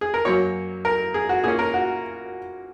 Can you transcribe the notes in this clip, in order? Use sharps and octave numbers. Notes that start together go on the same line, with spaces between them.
G#4
A#4
F#2 F#3 A#3 C#5
A#4
G#4
F#4
A#2 A#3 C#4 G#4
A#4
F#4